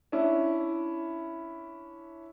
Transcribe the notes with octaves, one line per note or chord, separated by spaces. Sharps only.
C#4 D4 E4